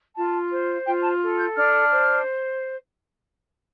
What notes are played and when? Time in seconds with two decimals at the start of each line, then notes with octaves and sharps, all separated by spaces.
0.15 F4 A5
0.50 C5
0.85 F4 G5
1.03 A5
1.21 A4
1.38 G6
1.55 D4 F6
1.90 C5